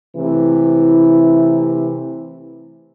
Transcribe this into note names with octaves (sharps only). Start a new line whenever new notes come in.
C3 E3 A3 E4